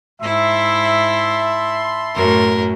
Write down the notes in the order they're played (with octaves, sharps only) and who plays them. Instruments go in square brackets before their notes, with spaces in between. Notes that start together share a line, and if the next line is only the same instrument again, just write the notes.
[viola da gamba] G#2 E4 [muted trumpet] E5 [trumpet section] A5 B5 C6
[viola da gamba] F#2 A2 [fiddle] A#4